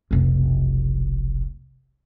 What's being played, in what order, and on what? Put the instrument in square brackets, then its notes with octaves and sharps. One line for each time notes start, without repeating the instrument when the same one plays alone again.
[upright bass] F1 B1